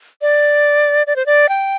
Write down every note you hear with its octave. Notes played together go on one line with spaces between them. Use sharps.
D5
D5
C5
D5
G5